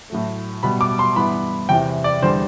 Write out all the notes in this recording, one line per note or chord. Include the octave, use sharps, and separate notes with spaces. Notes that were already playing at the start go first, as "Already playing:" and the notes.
A2 F#3 A3
B2 G3 B3 B5
D6
C6
G2 E3 B3 B5
E2 C3 E3 G5
D5
E2 D3 G3 C5